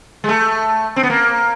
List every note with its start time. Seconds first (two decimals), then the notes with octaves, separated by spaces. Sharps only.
0.24 G#3
0.29 A3
0.96 C4
1.03 B3
1.10 A#3